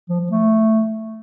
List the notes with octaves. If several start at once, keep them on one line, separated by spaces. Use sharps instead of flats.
F3
F3
A3